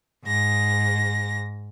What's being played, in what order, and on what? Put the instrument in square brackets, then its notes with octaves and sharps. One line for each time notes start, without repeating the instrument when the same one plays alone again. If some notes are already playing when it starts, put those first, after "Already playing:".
[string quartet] G#2 A#6